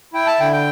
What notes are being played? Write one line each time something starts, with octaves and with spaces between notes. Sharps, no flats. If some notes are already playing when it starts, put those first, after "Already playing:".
E4 G5
A5
D3 G5
G5